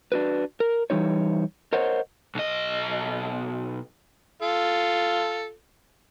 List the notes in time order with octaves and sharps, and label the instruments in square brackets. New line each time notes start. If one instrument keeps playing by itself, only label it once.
[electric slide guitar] D4 F#4 B4
A#4
E3 F3 G3 D#4 C#5
A#4 C5 C#5 D#5 F#5
[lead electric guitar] B1 D#5
[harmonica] F4 A4